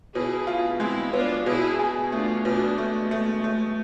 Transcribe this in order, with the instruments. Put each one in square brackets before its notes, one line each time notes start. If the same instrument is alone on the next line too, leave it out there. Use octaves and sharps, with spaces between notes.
[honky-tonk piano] B2 [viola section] E4 G#4
[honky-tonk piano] F4
[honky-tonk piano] G#3 [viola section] C4 E4
[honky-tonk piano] B3 [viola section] D4 F4
[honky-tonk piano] B2 [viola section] E4 G#4
[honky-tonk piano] G#4
[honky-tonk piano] A3 [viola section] D4 F4
[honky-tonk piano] B2 [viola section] B3 D4
[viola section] G#3 [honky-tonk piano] A3
[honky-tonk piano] A3
A3